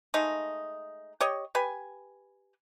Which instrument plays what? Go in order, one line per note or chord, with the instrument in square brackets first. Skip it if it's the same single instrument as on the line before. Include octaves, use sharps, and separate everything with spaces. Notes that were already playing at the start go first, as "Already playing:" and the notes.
[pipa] G#3 A3 D#4
G4 C#5 D#5
G4 B4 G#5